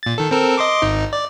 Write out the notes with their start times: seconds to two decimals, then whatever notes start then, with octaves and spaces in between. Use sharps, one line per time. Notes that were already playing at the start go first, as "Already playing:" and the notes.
0.03 A#2 A6
0.18 D#3 A4
0.31 C4 A4 A#4
0.57 D#5 C6 D6
0.82 G#1 D#4
1.13 D5